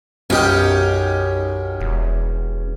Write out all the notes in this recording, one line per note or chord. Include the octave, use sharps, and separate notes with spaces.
B1 F#2 C#4 D#4 G4 G5
E1